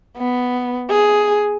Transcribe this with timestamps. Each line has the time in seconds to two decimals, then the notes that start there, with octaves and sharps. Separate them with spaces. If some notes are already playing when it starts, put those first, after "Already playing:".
0.17 B3
0.90 G#4